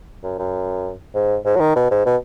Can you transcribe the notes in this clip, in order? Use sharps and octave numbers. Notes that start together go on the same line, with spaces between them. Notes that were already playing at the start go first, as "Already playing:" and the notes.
F#2
F#2
G#2
G#2
F#3
D#3
B2
G#2
B2